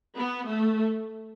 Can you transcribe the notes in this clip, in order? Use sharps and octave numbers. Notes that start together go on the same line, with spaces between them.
B3
A3